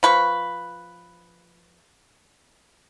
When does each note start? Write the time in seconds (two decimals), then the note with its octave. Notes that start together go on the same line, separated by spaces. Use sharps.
0.03 F3 B4 C#6